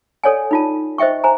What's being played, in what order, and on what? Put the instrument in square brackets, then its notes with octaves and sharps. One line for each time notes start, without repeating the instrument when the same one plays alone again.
[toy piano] A4 C#5 D5 F#5 G#5
D#4 F4 A5
C5 D#5 E5 G5 C#6
C5 G#5 A#5